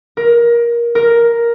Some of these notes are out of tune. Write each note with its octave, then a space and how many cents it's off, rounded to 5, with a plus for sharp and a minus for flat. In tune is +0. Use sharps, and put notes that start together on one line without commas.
A#4 +20
A#4 +5